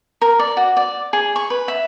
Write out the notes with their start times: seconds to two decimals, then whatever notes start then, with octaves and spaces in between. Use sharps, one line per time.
0.22 A#4
0.39 D5
0.57 F#4
0.77 D5
1.13 G#4
1.36 C#6
1.50 B4
1.68 E5